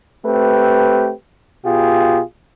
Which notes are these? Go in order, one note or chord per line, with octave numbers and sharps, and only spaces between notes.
A3 C4 G4 B4
B2 F4 G4 G#4